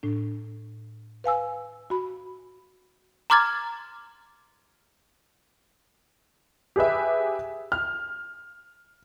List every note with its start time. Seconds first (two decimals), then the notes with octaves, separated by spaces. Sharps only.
0.03 A2 D4
1.24 B4 F5 G#5 E6
1.90 F#4 B5
3.30 A#5 C6 D6 F6 G#6 A6
6.76 G4 G#4 B4 E5
7.72 F6